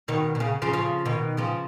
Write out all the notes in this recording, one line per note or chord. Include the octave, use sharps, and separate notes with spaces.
B2 D#3
B2
C#3
C#3 F3
C#3 F3
B2 D#3
C#3 F3